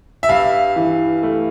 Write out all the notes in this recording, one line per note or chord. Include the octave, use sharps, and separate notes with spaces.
E5
G2 F5
E3
A3